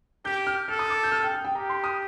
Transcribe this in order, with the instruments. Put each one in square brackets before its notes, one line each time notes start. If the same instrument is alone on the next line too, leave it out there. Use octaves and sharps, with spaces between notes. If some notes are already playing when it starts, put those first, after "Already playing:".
[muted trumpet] G4 [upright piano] G6
[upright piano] F6
[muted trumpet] A4 [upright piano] F6
[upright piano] D#6
D6
G6
F6
G5
G5
G5
[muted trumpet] G4 [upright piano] A#5
[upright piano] C6
D#6